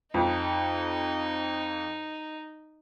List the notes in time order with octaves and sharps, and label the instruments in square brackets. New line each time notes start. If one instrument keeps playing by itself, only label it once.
[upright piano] F2 [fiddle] D#4